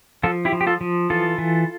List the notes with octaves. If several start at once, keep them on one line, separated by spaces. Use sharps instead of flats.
F3 F4 A4
E4 G4
F3
G4
F4 A4
F3
E3 F4 A4
E3